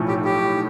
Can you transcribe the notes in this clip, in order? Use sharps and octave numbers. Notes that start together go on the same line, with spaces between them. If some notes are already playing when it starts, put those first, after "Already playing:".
Already playing: B1 A2 F3 A3
G4
G4